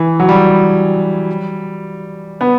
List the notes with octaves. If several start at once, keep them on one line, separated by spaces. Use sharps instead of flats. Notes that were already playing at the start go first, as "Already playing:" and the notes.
Already playing: E3
F#3
G3
B3